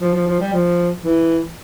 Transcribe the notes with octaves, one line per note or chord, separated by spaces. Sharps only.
F3
F3
F3
G3
F3
E3